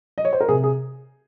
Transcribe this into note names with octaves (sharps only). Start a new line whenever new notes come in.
D#5
C#5
C5
A#4
C3 G#4
G#4